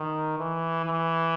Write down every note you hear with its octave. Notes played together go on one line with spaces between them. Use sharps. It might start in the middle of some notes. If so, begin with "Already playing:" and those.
Already playing: D#3
E3
E3